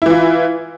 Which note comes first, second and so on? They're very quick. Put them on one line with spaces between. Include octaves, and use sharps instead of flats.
E4 E3 F4